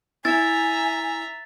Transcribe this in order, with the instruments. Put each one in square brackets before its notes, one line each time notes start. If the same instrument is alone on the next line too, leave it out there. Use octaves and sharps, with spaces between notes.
[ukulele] E4 [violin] E5 A#5 [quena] G#5 [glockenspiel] A6